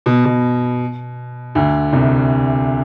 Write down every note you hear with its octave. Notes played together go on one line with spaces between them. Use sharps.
B2
B2
D2 D3
C2 C3